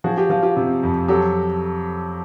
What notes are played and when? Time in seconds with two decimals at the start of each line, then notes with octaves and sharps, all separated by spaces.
0.04 F3 F#4 G#4
0.17 F4 G4
0.30 F3 F4
0.43 F4 G4
0.57 C3
0.83 F2
1.08 F#3 G4 A4